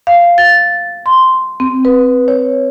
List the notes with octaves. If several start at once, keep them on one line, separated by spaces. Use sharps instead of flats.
F5
A6
C6
C4
B4
C#5